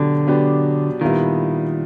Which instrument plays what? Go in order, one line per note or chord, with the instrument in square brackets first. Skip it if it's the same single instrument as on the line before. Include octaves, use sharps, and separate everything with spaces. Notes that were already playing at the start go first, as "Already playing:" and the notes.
Already playing: [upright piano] B2 F#3 B3 D4 G4 [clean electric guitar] D3
[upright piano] B2 F#3 B3 D4 G4
[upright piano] A#2 G3 B3 E4 [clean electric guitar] D#3